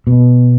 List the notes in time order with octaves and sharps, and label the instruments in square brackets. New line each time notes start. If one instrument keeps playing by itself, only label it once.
[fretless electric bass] B2